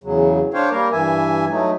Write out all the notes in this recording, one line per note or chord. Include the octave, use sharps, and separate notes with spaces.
E2 C#3 F#3
D4 C5 C#5 F5 G5
G3 A#3 A#4
G2 E3 E5 G#5
F#3 A3 D#4